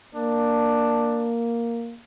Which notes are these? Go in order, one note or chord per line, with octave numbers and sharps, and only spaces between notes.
A#3 D4